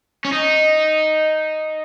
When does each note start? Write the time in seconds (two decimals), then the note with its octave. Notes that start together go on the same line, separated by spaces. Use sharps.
0.25 C#4
0.33 D#4